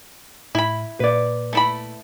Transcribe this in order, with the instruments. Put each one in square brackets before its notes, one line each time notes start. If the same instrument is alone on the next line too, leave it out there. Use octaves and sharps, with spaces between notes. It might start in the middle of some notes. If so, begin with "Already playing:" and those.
[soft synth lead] A2 [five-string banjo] E4 B5
[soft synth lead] A#2 [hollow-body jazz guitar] B4 D5
[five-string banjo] A3 E4 B5